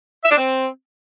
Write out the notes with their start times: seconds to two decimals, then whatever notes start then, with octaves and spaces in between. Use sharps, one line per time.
0.23 E5
0.30 D4
0.37 C4